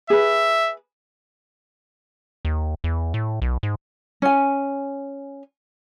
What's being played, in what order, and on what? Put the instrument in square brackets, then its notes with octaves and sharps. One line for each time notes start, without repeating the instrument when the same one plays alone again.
[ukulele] G#4 B4 [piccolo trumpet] E5
[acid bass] D#2
E2
A2
B1
G#2
[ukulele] C#4 G#5